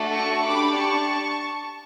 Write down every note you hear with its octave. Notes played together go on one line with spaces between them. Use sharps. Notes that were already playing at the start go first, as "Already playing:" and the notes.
Already playing: A3 D4 F#4 A4
A5 C#6
D4 G4 B5 D6
A5 C#6